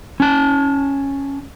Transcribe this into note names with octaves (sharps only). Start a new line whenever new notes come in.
C#4 A5